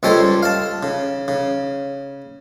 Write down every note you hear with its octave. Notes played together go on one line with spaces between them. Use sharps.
C#2 G3 G#3 A4 C5 C#5
F5 A5
C#3
C#3